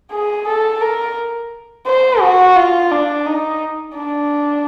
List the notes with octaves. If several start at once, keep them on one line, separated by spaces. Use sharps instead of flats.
G#4
A4
A#4
C5
F#4
F4
D4
D#4
D4